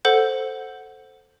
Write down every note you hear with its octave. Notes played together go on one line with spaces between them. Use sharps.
A4 C5 F#5 G6